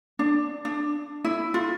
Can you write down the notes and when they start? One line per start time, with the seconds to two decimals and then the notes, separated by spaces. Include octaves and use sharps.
0.19 D4
0.65 D4
1.24 E4
1.54 F4